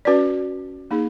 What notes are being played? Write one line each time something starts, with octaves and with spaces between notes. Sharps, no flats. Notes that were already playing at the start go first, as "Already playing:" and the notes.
C#4 F#4 B4 D5
A#3 D#4 G#4